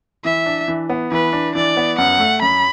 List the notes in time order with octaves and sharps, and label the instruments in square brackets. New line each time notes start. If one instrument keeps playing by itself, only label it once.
[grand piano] E3 [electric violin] E5
[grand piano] D4
E3
B3
[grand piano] E3 [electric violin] B4
[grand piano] D4
[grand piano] E3 [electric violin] D5
[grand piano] B3
[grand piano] F#2 [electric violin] F#5
[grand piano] A3
[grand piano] F#2 [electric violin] B5